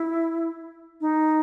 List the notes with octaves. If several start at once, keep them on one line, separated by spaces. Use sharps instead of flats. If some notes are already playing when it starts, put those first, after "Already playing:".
Already playing: E4
D#4